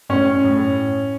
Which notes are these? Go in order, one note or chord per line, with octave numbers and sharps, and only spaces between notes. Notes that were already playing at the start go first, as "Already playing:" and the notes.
A2 C#4
A2